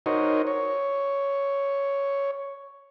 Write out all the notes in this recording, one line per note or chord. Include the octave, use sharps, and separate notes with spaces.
D#4 F#4 A#4 C5 C#5 D#5
C#5